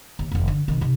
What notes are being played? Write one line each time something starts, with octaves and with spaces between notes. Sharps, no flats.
D#2
F1 D#2
D3
C3 D#3
C3 D#4